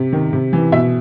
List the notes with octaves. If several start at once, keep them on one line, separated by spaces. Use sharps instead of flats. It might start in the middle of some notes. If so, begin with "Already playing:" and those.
Already playing: C3
D#3
C3
E3
B2 E5